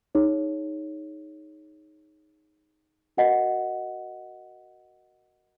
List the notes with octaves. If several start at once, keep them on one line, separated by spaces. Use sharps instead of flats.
D#4 G#4 C#5
F#4 A#4 D#5 F#5